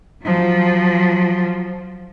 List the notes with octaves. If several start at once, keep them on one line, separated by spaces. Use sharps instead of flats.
F3 F#3